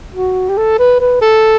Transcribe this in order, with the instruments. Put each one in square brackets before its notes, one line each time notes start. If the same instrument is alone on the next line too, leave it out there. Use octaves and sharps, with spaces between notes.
[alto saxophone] F#4
G4
A4
B4
B4
A4